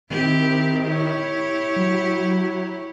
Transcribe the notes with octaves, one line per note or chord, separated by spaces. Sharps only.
D#3 C4 E4 G4
E4 G4 C#5
F#3